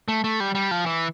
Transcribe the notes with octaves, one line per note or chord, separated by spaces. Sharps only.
A3
A3
G3
G3
F3
E3